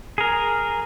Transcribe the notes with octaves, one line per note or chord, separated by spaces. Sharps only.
G#4 A#4